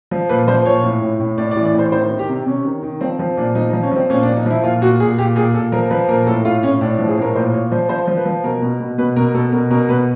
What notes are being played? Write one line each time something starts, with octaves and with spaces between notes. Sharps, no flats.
F3
A#2 B4
F3 C5
A#2 C#5
A2
A2
A2
A2 D5
D5
E3
D5
A2 C5
D#3 C5
D#3
G4
C3
C3 C#4
D#3
D#3
F3 C4
F3 C4
A#2 D4
F3 D#4
D#4
F3
C#4
F3 C4
A#2 C#4
D4
A#2
D#4
F3 E4
A#2 F4
A#2 F#4
A#2 G#4
A#2 G4
A#2 G#4
A#2 A4
F3 A#4
F3 B4
A#2 A#4
A2 A4
A2 F4
A2 C#4
A2 D4
D4
F3
G#4
A2 A#4
A#2 C5
A#2 C#5
F3 C5
F3 C5
F3
B4
F3
B2 A#4
B2
B2
B2 B4
B2 A#4
B2 A4
B2 A#4
B2 A#4
B2 B4